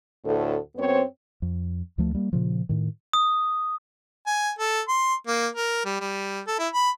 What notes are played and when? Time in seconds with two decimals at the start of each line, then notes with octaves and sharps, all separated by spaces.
0.24 D2 A2 A4
0.76 F#2 B3 C4 C5 C#5
1.42 F2
1.98 D2 F3 A3
2.15 G3 A#3
2.33 A#2 C#3 F3
2.69 A2 D#3
3.13 D#6
4.27 G#5
4.59 A4
4.88 C6
5.27 A#3
5.55 A#4
5.85 G3
6.00 G3
6.47 A4
6.59 E4
6.73 B5